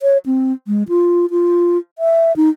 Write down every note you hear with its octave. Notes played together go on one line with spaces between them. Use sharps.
C#5
C4
G#3
F4
F4
E5
D#4